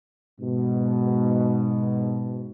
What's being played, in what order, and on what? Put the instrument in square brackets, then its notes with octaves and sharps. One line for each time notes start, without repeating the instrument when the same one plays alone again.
[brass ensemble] G#2 B2